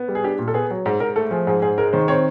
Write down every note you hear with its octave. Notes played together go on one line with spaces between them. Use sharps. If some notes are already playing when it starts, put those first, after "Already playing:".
Already playing: B3
G3
G#4
D4 G4
A#2
A4
B3 G#4
F#3
G#2
G#2 A#4
A3 A4
F3 G#4
G#2 G#4
G#2 G#4
G#3 A#4
D#3 C5
C4 C#5